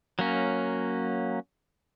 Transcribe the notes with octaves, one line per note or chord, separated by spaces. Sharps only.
F#3 A#3 C#4